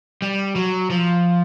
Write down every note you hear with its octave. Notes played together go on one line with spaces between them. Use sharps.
G3
F#3
F3